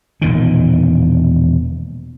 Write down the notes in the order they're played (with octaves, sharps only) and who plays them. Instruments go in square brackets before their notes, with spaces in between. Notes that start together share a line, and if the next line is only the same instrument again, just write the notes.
[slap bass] E1 A#2 D#3